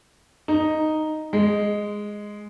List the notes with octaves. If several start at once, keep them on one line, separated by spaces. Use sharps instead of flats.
D#4
G#3